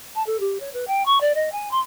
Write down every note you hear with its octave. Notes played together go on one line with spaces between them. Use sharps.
A5
A4
G4
C#5
B4
G5
C#6
D5
D#5
G#5
C6